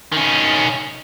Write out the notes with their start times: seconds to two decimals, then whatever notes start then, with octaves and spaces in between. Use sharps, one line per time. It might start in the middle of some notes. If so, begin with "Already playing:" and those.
0.12 D#3 C#4